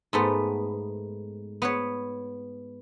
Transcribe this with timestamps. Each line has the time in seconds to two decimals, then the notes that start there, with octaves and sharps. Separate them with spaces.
0.13 G#2 A3 B3
1.62 B3 B4 C#5